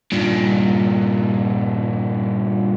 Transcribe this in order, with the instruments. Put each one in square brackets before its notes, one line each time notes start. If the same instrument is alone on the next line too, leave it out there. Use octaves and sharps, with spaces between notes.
[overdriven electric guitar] G2 A#2